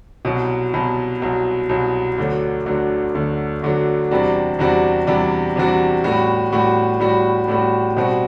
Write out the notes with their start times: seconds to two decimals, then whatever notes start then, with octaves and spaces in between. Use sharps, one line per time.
0.25 C2 B2 F#3
0.74 C2 B2 F#3
1.22 C2 B2 F#3
1.69 C2 B2 F#3
2.18 D2 D3 F#3
2.66 D2 D3 F#3
3.15 D2 D3 F#3
3.62 D2 D3 F#3
4.11 E2 C3 G3 D4 F#4
4.59 E2 C3 G3 D4 F#4
5.07 E2 C3 G3 D4 F#4
5.56 E2 C3 G3 D4 F#4
6.04 A2 G3 B3 F#4
6.52 A2 G3 B3 F#4
7.00 A2 G3 B3 F#4
7.48 A2 G3 B3 F#4
7.97 B2 G3 C4 F#4